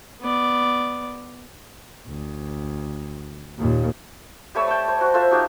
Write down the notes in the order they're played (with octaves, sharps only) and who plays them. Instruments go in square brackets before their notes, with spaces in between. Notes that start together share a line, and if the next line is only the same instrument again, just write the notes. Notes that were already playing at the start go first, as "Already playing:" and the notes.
[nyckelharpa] B3 D5
[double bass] D2
D#2 A#2
[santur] G3 A3 C#5 E6
G5 A5
C5
F#4
F4 A4 C5 E5
D#4 F#4 G4 F5